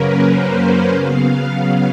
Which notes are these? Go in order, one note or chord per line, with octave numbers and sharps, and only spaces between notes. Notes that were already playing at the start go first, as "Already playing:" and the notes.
Already playing: F#2 C#3 F#3 A#3 C#4 A#4 B4
C5
C#3 F#3 B3 F5